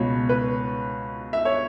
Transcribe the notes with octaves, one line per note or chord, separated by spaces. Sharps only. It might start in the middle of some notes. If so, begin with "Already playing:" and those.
Already playing: C#2 B2 C#5
B4
E5
C#5